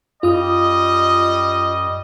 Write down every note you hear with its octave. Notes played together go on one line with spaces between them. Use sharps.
F#2 G3 F4 D#5 D#6